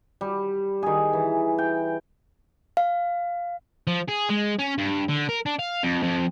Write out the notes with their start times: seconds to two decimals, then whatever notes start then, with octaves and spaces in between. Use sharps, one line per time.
0.21 G3
0.83 D#3 G#4
1.13 E3
1.58 G5
2.77 F5
3.87 F3
4.08 G#4
4.29 G#3
4.59 C#4
4.78 G2
5.09 D3
5.29 A#4
5.46 D4
5.59 F5
5.84 F2
6.03 F2